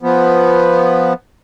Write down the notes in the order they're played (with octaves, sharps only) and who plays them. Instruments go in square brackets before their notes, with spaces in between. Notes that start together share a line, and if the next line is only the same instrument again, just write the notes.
[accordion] F3 B3